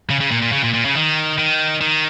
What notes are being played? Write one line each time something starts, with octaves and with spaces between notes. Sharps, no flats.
C#3
C#3
A#2
A#2
C#3
A#2
A#2
C#3
D#3
D#3
D#3